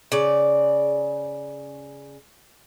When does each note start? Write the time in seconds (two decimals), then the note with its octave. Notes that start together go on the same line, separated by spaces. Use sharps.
0.12 C#3 D5